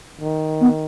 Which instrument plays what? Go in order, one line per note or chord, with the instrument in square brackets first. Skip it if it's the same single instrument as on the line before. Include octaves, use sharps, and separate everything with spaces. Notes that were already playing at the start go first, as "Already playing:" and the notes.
[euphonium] D#3
[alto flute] B3